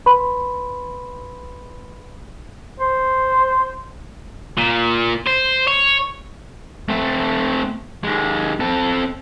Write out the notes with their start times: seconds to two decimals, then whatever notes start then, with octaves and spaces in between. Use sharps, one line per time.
0.06 B4 B5 C6
2.80 C5
4.58 A#2
5.27 C5
5.67 C#5
6.89 A3 C4
8.04 D#2 G#3
8.60 C4 A4